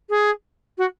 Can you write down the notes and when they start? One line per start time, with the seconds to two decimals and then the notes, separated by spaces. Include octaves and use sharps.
0.09 G#4
0.77 F#4